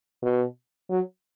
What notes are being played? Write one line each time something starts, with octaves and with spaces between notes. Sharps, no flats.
B2
F#3